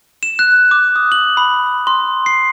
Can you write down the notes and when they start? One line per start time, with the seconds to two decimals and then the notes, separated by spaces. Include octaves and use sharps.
0.23 E7
0.39 F#6
0.71 D6
0.96 D#6
1.12 F#7
1.37 B5
1.87 C6
2.26 C7